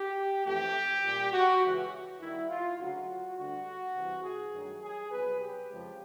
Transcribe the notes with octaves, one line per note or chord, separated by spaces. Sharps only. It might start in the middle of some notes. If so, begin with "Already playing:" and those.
Already playing: G4
F2 C3 E3 A3 G4
A#2 G3
F#4
C#2 C#3 E3
D#2 D#3 G3 E4
F4
D2 C#3 F#3 F#4
D2 D3 G3 F#4
C2 C3 E3
G#4
G2 D#3 F#3 A3
G#4
C2 B2 F#3 B4
G4
F2 C#3 F3 G#3